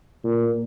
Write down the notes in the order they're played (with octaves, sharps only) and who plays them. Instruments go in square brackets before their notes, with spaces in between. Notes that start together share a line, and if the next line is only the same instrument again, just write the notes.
[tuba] A#2